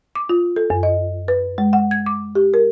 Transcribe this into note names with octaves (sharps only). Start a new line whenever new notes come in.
D6
F4
A4
F#2
D#5
B4
G#3
F#5
G#6
D6
G4
A#4